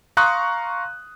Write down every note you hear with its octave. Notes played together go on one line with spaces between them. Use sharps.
F5 A#5 C6 C#6 D#6 F#6